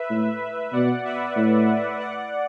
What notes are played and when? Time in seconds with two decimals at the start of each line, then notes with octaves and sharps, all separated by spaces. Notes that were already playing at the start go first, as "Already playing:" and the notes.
Already playing: B4 E5
0.10 A2
0.73 B2 D5 F#5
1.04 B4 E5
1.36 A2
2.00 D5 F#5